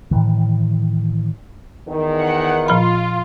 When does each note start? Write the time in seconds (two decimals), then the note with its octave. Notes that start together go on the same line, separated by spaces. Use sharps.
0.11 A2 C3 D#3 E3
1.88 E2 D#3
2.20 F#5
2.68 A#2 F3 F4 B5